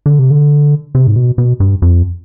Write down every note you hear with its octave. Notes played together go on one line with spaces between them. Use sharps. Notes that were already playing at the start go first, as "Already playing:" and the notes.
D3
C3
D3
C3
G#2
B2
B2
G2
F2